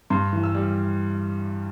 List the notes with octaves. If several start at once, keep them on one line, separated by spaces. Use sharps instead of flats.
G2 C6
E3
E6
G3